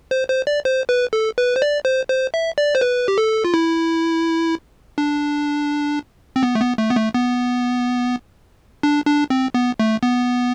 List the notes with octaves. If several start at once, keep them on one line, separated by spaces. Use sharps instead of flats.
C5
C5
D5
C5
B4
A4
B4
C5
D5
C5
C5
E5
D5
C5
B4
G4
A4
F4
E4
D4
C4
B3
A3
B3
A3
B3
A3
B3
D4
D4
C4
B3
A3
B3